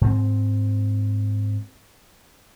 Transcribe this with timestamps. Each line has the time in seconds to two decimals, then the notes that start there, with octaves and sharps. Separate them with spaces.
0.01 G#2 C4